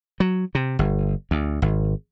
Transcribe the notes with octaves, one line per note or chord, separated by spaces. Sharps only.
F#3
C3
G1
D2
G#1